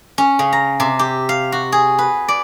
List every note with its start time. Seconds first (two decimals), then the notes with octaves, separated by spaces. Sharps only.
0.18 C#4
0.39 C#3
0.53 A#5
0.80 C3
0.99 G4
1.29 F5
1.52 F#4
1.72 G#4
1.98 B4
2.28 D5